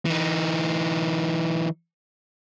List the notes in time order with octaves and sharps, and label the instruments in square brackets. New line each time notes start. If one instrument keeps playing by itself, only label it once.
[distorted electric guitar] E3 D#4